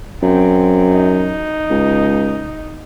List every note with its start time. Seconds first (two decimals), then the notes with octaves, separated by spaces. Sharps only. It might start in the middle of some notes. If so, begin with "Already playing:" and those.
0.22 F#2 C4
0.92 D#4
1.70 C#2